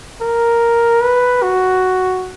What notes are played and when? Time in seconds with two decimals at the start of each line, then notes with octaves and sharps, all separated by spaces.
0.21 A#4
1.02 B4
1.43 F#4